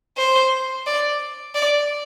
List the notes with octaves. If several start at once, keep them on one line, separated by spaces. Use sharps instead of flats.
C5
D5
D5